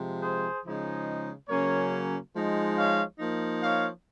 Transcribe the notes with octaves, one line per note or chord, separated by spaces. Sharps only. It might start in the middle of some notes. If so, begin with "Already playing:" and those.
Already playing: C3 F3 G#3
G#4 C5
C#3 F3 G#3 D#4
C#3 F#3 A#3 C#4 A#4 C#5
F3 G#3 D#4
C#5 F5
F3 A#3 D#4
C#5 F5